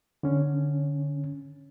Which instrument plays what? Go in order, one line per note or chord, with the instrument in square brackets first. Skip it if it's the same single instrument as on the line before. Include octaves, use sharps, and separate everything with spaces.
[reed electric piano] D3 C#4